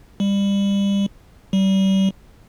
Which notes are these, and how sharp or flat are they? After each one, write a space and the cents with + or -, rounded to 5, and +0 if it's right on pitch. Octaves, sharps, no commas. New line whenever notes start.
G3 +25
G3 -30